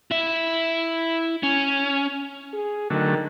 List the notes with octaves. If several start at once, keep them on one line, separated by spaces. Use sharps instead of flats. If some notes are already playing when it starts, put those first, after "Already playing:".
E4 E5
C#4
G#4
D3 D#3 F#3 A3